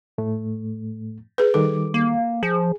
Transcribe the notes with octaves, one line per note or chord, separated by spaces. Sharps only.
A2 A3
G#4 B4
D#3 G3 A4 D6
A#3
F3 G#4